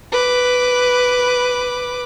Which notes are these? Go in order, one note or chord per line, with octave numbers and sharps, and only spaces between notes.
B4 D6